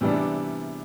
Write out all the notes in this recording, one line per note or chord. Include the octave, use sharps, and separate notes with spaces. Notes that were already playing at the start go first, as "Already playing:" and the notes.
C3 E3 G3 B3 D4